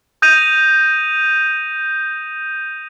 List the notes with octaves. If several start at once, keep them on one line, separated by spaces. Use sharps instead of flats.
D#6 G6 A#6 D#7 F7